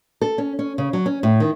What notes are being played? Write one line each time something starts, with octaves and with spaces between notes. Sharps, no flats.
A4
C#4
C#4
C#3
F#3
C#4
A2
D#3